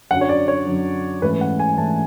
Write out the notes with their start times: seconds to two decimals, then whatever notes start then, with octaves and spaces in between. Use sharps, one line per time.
0.11 F#2 D3 F#3 F#5
0.21 C#5
0.29 D5
0.48 C#5
0.66 F#2 D3 F#3
1.22 G#2 E3 A3 C#4 B4
1.41 F#5
1.59 G#5
1.78 G#2 E3 A3 C#4 A5